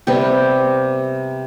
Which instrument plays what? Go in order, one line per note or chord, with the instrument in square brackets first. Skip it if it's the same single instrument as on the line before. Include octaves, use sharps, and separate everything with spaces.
[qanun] C3 G3 B3 G4 B4